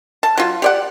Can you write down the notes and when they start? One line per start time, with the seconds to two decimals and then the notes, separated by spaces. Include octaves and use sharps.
0.23 A5
0.37 F#3 F4
0.62 G4 D5 F#5